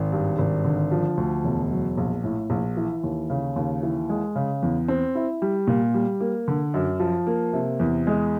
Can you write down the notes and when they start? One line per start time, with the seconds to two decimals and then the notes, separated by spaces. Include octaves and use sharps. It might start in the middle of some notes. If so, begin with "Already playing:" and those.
Already playing: G#1
0.12 G2
0.38 G#1
0.64 D3
0.91 F3
1.17 D2
1.44 E1
1.71 F#3
1.97 A#1
2.24 A2
2.50 A#1
2.77 E3
3.03 D#2
3.30 C#3
3.56 D#2
3.83 E3
4.09 G#3
4.36 C#3
4.62 E2
4.88 C4
5.15 E4
5.42 G3
5.67 A#2
5.94 G3
6.21 A#3
6.48 D3
6.74 F#2
7.00 F3
7.27 A#3
7.53 C3
7.80 E2
8.07 G#3